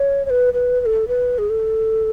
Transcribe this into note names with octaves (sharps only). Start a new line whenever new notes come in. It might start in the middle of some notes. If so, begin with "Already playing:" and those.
Already playing: C#5
C#5
B4
B4
B4
A4
B4
G#4
A4